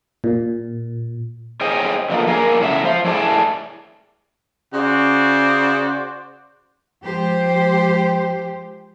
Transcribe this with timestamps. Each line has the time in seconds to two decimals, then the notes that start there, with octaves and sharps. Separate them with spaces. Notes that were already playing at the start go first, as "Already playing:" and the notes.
0.24 A#2
1.61 G#4 C5 C#5 D#5 G5 G#5
2.10 D3 F3 A#3
2.27 A#3 G#4 A#4
2.60 A2 C#3 F#3 C5 E5
2.84 F3 C5
3.05 A2 E4 G#4 D5 G5 A5
4.73 C#3 F#4 C5 D5
7.04 F3 G#3 G4 C5